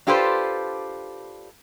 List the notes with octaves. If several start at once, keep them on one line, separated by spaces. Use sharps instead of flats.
D4 F4 G4 A4 B4 C5